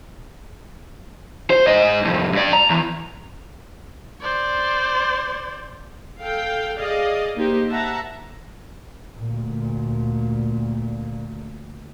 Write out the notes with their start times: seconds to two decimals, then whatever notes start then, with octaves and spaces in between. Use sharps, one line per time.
1.50 C5
1.67 G#2 D#5
2.05 C2 F2
2.33 G2 D5
2.53 A#5
2.70 E2
4.21 C5 D5
6.21 A4 F5 G5
6.77 G#4 D5 D#5 F5
7.36 A#3 D#4 G4 C5
7.69 E5 F#5 A5 A#5
9.18 D2 A#2